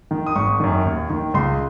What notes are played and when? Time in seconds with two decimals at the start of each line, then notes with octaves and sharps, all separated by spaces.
0.11 D#3
0.26 D#6
0.35 G#1 C#6
0.60 F#2 D#3
0.85 D#2
1.10 D#3
1.34 C#2 C6